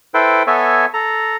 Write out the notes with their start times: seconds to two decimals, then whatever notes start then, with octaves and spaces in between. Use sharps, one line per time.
0.14 E4 A4 B4 C5 G5
0.47 B3 A4 C#5 E5 G#5
0.94 A4 A#5